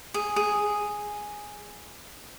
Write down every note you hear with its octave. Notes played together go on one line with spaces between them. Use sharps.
G#4
G#4